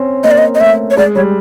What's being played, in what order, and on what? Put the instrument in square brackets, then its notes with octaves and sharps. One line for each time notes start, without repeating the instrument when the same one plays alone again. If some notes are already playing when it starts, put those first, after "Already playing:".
Already playing: [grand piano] C4 C#4
[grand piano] A#3 [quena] D#5
[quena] D5
D#5
D#5
[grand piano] A3 [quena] E5
[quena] C#5
[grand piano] G#3 [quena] D5
[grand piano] G3 [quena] C#5